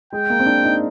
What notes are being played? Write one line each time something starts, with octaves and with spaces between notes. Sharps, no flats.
G#3 G5
A#3
C4
D4
D#4